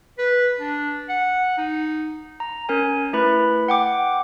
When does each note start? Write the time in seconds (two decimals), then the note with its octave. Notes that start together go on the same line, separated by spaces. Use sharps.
0.19 B4
0.60 D4
1.09 F#5
1.58 D#4
2.40 A#5
2.69 C#4 A#4 G#5
3.13 A3 E4 B4 B5
3.68 F#5 G5 D6